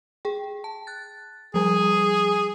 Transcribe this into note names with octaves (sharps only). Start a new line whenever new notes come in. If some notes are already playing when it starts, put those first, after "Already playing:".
G#4 G5
A5
F#6 A6
F3 G3 G#4